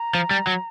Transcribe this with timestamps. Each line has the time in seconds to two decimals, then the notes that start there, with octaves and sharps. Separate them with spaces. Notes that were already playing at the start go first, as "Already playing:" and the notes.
Already playing: A#5
0.15 F3
0.31 G3
0.47 F#3